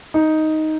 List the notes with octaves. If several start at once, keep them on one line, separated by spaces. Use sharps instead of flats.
D#4